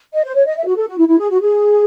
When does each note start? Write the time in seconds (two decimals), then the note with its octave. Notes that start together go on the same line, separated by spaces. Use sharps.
0.13 D#5
0.24 C5
0.35 C#5
0.46 D#5
0.57 E5
0.66 F#4
0.77 A4
0.88 F#4
0.98 E4
1.08 E4
1.19 G#4
1.30 F#4
1.41 G#4